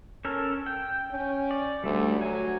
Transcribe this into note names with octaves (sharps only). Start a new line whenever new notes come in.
C#4 A4 A#4
G5
C#4
D5
D2 G3 A3
F#3 G#5